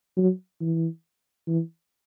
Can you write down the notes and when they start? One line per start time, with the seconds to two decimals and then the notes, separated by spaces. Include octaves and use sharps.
0.17 F#3
0.61 E3
1.47 E3